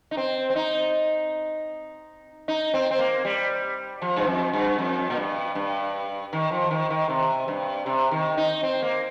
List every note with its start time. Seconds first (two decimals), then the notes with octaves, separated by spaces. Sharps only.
0.11 D#4
0.17 C4
0.50 C4
0.56 D#4
2.48 D#4
2.74 C4
2.91 C4
2.99 A#3
3.25 G3
4.02 F3
4.16 G2
4.27 F2
4.53 G2
4.78 F2
5.10 A#2
5.17 G2
5.55 G2
6.33 D#3
6.51 F3
6.71 D#3
6.90 D#3
7.09 C3
7.48 G2
7.86 C3
8.11 D#3
8.37 D#4
8.63 C4
8.82 A#3